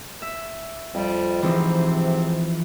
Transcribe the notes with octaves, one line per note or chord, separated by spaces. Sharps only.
E5
F2 G3
G#2 C3 E3 F3 C4 D#4